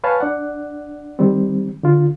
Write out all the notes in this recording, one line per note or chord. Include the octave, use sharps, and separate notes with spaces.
B4 C#5 F5 G#5 A5 B5
D4 D5 F#5
D#3 G3 C4
D3 F4